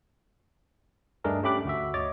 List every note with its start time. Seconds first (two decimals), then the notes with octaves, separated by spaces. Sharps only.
1.24 G2 A3 D4 G#4 A#4 D#5
1.43 A3 C#4 G4 B5 D6 F#6
1.65 D2 F#4 E5
1.94 C#5 D#5 D6 A6